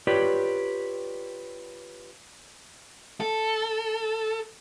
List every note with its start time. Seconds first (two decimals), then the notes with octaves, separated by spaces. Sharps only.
0.07 F4 G4 B4 C#5 D5
3.20 A4